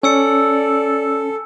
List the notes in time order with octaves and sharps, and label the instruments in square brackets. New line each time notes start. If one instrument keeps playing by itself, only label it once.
[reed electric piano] C#4 [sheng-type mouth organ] A4 [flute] D5 [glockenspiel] G#5 E6 C#7